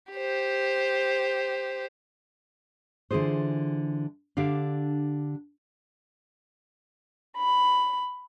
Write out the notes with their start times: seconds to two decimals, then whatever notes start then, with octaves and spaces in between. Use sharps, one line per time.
0.13 G4 C5
3.11 D3 E3 F4 G#4 C5
4.37 D3 D4 G4 F5
7.37 B5